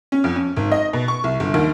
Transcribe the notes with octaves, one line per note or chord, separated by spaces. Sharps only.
C#4
F2
C#4
G#1
D#5
B2
C#6
C2
G1
D#2